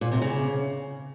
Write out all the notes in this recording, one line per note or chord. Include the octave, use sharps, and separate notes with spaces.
A#2
C3
C#3